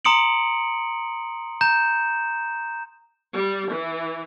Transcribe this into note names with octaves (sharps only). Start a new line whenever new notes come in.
A#5 C6 D#6 C#7 D7 F#7
A#5 G6 E7
G3
E3